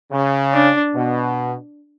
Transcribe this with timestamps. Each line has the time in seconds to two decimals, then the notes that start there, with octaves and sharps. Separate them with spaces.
0.12 C#3
0.54 D4
0.95 B2